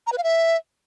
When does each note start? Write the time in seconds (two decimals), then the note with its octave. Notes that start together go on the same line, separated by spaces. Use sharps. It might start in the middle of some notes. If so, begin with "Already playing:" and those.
0.07 A#5
0.12 B4
0.18 F5
0.23 E5